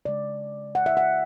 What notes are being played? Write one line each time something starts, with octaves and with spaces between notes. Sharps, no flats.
C#3 G#3 D5
F#5
E5
F#5